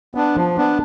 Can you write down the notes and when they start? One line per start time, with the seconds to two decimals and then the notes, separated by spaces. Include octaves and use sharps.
0.15 B3 D4
0.35 F3
0.57 B3 D4